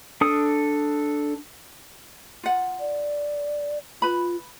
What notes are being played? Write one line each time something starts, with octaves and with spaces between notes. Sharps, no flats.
D4 A4 D#6
F4 F#5
D5
F4 B4 B5